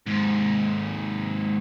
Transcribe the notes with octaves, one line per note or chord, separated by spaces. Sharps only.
D#2 G#2